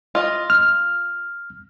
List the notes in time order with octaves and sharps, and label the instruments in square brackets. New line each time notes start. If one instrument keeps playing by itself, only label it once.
[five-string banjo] F4 D#5
[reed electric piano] F6